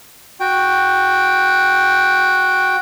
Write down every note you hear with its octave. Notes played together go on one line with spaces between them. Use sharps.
F#4 G5